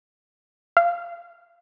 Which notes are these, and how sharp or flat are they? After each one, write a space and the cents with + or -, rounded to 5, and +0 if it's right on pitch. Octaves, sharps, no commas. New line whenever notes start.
F5 -15